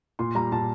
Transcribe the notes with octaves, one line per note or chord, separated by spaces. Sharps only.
A#2 C6
G3 A#5
A#2 A5